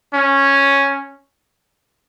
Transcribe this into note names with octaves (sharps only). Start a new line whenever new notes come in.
C#4